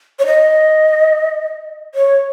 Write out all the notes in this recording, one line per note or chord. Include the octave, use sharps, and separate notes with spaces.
C#5
D#5
C#5